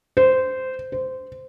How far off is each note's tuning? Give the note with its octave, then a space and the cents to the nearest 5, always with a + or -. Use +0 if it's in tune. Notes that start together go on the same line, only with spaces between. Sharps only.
C5 -15
C5 -15